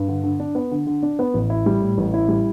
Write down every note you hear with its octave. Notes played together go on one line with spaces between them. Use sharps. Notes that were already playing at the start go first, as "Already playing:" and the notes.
Already playing: G2
D3
D3
D4
B3
D3
D3
D4
B3
A1
E4
G3
A2
A1
E4
G3